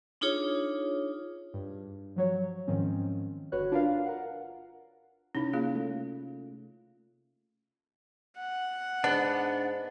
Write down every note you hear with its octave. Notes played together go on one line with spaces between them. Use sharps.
D4 D#4 F4 G#4 C#5
G2
F3 F#3 C#5
G#2 D#3 F3 C4 C#4
G1 F#4 B4 C#5 F#6
D4 F4 A#4 B4 D5 F5
A#4 F#5
C3 C#4 D#4 E4
A#3 F4 G#4
A3
F#5
G#2 B3 D4